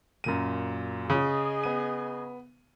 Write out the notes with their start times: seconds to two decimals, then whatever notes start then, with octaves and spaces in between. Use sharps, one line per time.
0.24 F#2 A#2 D#7
1.10 C#3 G#4 D#5
1.64 B3 D#7